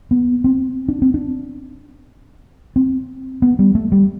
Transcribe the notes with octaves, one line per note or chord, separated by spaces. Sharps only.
B3
C4
D4
C4
D4
C4
B3
G3
A3
G3